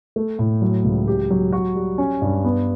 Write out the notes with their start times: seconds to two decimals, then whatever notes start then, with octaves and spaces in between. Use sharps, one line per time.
0.16 A3
0.39 A2
0.62 F#3
0.84 C#2
1.08 G4
1.31 F#3
1.52 F#4
1.75 G3
1.98 C#4
2.22 G2
2.44 B3